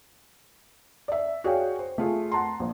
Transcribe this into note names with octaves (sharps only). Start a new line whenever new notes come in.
D5 E5
F#4 G#4 C#5 D5 F5 G5
C5
A3 F4 G#4
F#5 A5 A#5 C6
A#1